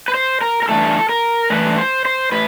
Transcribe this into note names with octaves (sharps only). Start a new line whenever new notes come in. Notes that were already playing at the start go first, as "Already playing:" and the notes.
B4
C5
A#4
A#4
G2 E3 A3 A4
A#4
G2 E3 A3 B4
C5
C5
A2 B4